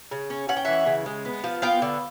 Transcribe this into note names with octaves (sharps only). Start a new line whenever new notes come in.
C#3
C#4
C#4 F#5
G5
E3 E5 F#5
C#3
G#3
B3
F3
B3 F5 G5
D3